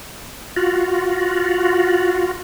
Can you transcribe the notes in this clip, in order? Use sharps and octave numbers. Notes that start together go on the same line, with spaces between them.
F4 F#4